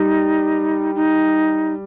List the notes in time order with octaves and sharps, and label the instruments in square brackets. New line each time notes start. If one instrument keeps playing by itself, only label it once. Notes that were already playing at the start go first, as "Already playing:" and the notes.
Already playing: [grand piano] G3 [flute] D#4
[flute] D#4